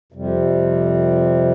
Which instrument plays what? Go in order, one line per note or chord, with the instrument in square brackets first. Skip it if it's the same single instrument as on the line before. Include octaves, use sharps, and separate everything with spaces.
[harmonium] F2 C3 G3